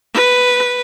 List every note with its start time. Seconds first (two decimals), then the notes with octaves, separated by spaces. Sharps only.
0.14 B4